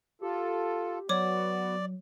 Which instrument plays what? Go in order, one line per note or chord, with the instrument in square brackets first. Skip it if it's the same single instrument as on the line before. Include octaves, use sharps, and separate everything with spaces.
[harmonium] F4 A4 [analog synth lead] G4
[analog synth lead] F#3 [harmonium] B3 F#4 [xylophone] C#5 D6 [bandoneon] D5